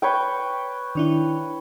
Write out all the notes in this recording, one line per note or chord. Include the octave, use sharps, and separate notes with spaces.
B4 C#5 G5
D#3 D4 E4